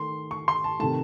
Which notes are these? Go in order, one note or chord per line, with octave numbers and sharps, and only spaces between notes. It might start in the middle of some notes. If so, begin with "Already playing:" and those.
Already playing: D#3 A3 C6
C#6
C6
A5
C3 D#3 A3 A5